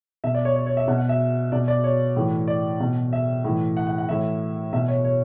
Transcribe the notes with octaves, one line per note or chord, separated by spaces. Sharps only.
B2 E5
D5
C#5
C#5
C#5
E5
B2 F#5
F#5
E5
B2 D5
D5
C#5
A2 E3
D5
B2
E5
A2 E3
F#5
F#5
F#5
A2 E3 E5
B2 E5
C#5
C#5